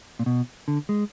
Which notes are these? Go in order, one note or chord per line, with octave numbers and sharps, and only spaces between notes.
A#2
B2
D3
G#3